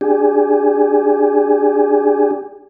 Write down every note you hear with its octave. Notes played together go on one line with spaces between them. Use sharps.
D4 G4 G#4